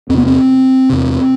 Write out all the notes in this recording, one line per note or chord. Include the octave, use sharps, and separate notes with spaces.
E2 C3 B3 C4
C4
E2 C3